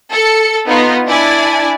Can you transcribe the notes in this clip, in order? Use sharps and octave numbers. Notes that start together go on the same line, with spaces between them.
A4 C#7
B3 D#4 F4
D4 E4 D5 G#5